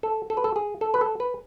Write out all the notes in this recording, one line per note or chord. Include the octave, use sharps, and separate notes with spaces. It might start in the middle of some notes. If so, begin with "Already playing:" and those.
A4
A4
B4
A4
G#4
A4
B4
A4
B4